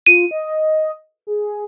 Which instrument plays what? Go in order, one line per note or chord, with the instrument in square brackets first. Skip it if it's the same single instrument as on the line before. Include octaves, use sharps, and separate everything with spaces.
[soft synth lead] F4 [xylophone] D#7
[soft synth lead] D#5
G#4